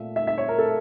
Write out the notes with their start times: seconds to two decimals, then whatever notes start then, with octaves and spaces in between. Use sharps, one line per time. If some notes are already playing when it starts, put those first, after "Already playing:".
Already playing: A#2 A3 E5
0.16 E5
0.27 E5
0.38 C#5
0.48 A#4
0.58 A4